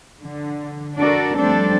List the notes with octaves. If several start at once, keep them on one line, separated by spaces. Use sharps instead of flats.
D3
D4 F#4 A4 A#4 D5
F3 G3 A3 C4 D4 A4